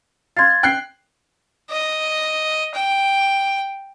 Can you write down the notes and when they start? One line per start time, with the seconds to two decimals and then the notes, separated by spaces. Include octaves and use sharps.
0.37 F5 C6 G#6 A6
0.63 G5 F#6 C7
1.71 D#5
2.75 G5